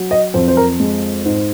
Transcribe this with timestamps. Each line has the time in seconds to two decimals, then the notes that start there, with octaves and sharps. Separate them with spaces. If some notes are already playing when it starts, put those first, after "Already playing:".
Already playing: F#3
0.11 D#5
0.34 F2 C5
0.48 C5
0.57 A#4
0.80 G#3
1.25 G#2